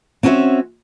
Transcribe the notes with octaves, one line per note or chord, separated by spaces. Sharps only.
C4 C#4 F#4 A4 C#5 E5